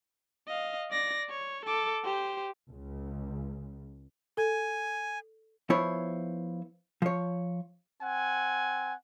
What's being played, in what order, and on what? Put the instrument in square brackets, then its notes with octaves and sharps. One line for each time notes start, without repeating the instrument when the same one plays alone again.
[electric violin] D#5 F5
D5 A#6
C#5
A4 D6
G4 C5
[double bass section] C#2 C#3
[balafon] A4 [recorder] G#5
[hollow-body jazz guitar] F3 B3 E4 C5 C#5
F3 C#5
[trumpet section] C4 F#5 G#5